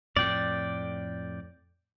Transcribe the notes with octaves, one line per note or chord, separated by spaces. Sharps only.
F2 A2 D5 G5